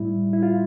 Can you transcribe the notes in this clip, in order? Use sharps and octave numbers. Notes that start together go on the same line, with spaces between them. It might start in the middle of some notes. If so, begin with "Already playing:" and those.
Already playing: A2 G3 E4
E4
F4